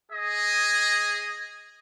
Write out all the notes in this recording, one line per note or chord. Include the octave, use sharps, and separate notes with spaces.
G#4 D#5